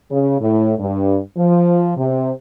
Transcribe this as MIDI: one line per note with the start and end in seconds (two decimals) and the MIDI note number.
0.11 0.37 49
0.41 0.75 45
0.79 1.18 43
1.38 1.91 53
1.96 2.32 48